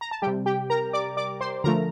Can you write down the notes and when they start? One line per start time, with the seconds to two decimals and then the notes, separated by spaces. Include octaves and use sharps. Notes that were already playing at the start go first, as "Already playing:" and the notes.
0.01 A#5
0.11 A5
0.22 C3 G3 G4 G5
0.46 G4 G5
0.70 A#4 A#5
0.93 D5 D6
1.17 D5 D6
1.40 C5 C6
1.64 D3 F3 A3 A#4 A#5